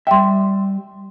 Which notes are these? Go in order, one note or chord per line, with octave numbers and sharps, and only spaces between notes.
G3 E5 G5 C6